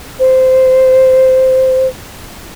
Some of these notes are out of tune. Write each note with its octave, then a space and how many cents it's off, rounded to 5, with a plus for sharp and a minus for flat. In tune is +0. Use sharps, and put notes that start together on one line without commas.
C5 -10